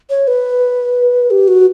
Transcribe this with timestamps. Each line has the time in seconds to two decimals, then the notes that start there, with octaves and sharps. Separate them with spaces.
0.10 C#5
0.28 B4
1.31 G4
1.48 F#4